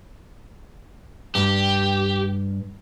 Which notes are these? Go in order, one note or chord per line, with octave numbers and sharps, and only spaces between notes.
G2 G4